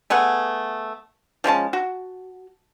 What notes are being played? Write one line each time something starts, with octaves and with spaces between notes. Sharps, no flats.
A3 B3 G#4 F#5
F3 G#3 C#4 A5
F#4